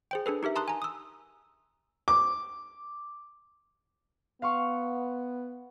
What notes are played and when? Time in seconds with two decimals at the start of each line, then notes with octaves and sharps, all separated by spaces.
0.11 G#4 C5 G5
0.26 D4 G#4 A4 B4
0.43 D#4 G4 A#4 E5
0.56 A5 A#5 C6 D#6 F#6
0.68 G#5 A#5
0.82 D#6 E6
2.08 D6
4.42 B3 F5 C6 C#6